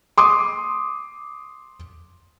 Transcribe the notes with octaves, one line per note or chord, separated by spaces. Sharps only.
C6 D6 D#6